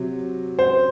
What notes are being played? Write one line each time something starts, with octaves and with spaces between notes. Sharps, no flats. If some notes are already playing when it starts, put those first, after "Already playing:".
Already playing: C3 F#3
C5